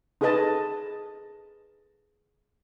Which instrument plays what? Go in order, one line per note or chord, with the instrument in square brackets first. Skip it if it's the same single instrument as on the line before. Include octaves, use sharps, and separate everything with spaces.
[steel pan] D#4 G#4 A4 B4 D#5 A5